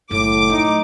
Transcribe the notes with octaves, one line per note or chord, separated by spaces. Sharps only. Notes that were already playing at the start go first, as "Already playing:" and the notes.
F#1 A2 D6
F#3 A3 D#4